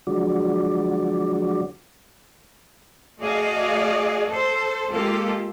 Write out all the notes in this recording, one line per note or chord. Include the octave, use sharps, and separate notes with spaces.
D3 F3 F#3 G#3 F#4 D5
A3 F#4 G#4 D5 D#5 F5
A4 C5
G#3 A#3 F4 G4 A4